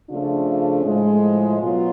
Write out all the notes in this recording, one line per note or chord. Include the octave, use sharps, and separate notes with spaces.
C#3 F3 A3 D4 F4
A2 F3 G#3
B2 F#3 F4